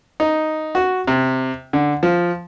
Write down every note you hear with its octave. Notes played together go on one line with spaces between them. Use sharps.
D#4
F#4
C3
D3
F3